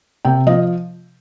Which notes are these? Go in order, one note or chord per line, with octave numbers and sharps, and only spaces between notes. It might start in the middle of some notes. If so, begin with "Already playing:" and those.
C3 G5
F3 D#5